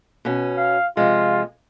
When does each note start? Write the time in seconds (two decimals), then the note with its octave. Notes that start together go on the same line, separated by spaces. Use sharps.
0.25 B2 C#4
0.58 F5
0.97 C3 F3 G#3 F4